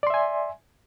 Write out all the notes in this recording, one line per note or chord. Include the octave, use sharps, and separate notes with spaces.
D5 E5 G#5 C6